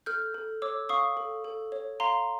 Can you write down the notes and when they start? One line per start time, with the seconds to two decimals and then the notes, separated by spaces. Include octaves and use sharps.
0.06 A4 F6 G6
0.34 A4
0.62 C#5 D6 E6
0.89 F5 C#6 D#6
1.17 A4
1.44 A4
1.72 C#5
2.00 F5 A#5 C6